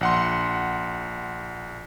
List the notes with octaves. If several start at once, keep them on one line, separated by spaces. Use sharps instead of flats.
A#1 F#5 C6